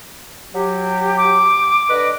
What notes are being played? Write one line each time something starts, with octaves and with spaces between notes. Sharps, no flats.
F#3 G4
D6
D3 B4 D#5